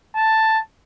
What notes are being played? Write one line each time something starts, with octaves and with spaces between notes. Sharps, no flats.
A5